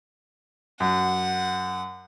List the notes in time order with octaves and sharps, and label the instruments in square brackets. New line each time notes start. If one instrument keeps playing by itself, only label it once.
[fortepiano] F#2 [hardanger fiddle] F#5